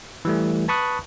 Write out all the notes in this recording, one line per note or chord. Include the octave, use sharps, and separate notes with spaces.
E3 G3 A3
B4 A5 B5 C#6 D#6 F#6